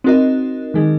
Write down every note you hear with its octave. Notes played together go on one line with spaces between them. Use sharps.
C4 D#4 F#4 A#4 D#5
D#3 G#3 D#4 G#4